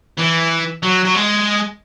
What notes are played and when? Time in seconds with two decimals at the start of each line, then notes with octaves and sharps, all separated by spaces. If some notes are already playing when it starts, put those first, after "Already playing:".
0.19 E3
0.83 F#3
1.05 F#3
1.15 G#3